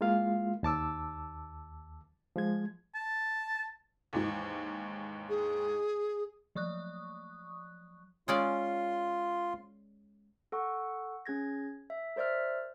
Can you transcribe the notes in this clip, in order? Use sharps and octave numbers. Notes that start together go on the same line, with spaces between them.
G#3 A#3 E4 F4 F5
D#2 A5 D6 E6
F3 G#3 G#6
A5
D#2 G#2 E3
G#4
F3 F#3 C#6 D#6 F#6
G#3 C#4 F4 D5 C6
A4 F#5 C#6
C#4 G#4 G#6 A#6
E5
A#4 C5 D5 E5 F6